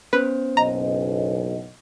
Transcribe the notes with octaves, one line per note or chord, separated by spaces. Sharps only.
B3 C#4 B4 C5
F#1 B1 D#5 A#5